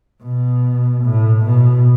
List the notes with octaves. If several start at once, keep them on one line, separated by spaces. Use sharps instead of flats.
B2
A2
B2